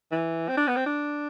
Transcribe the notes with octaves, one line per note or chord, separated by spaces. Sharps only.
E3
C4
D4
B3
C4
D4